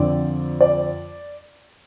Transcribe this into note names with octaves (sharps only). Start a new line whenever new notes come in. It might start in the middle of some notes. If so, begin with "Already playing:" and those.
Already playing: F2 D3 F3 C4 D5
D5